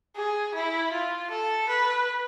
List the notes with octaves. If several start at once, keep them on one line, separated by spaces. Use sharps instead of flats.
G#4
E4
F4
A4
B4